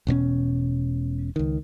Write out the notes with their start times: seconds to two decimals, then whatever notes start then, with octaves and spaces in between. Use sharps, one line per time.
0.07 E1 B2 B3 C#4
1.36 C#2 D#3